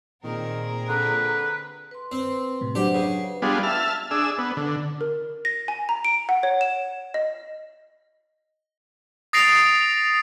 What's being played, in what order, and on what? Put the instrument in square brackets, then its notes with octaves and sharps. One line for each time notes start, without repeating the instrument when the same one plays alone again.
[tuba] A#2 [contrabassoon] D#3 [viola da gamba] C4 G#4 A#4
[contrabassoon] D3 [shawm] B4
[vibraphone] B4 C6
[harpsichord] C4
[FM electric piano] A2 C3
[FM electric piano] F#3 D4 [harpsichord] G4 [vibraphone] C5 F#5
[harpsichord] C#3 [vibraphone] B4
[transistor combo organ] G3 B3 D4 F4 G#4
E5 A5 F6
D4 G#4 E6
B3
D3
[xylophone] A#4
A#6
G#5
A#5
D7
F#5
C#5
E7
D#5
[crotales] D#6 A6 A#6 C7 D7 F7